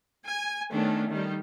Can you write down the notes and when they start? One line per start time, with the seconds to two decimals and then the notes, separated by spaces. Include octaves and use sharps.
0.25 G#5
0.73 D#3 A3 B3 C#4 D4
1.10 D#3 G3